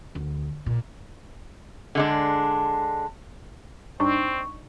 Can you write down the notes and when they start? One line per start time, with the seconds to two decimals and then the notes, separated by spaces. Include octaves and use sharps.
0.15 D2
0.66 A#2
1.95 D3 G#3 D4
4.00 G2 C4 D4 D#4 C#6